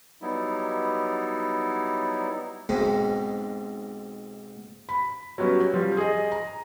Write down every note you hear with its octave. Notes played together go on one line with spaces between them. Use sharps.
F#3 G3 B3 D#4 E4
B1 G#2 C3
B5
F#3 G3 B3 C#4
F3 G3
G#4 D#5
A#5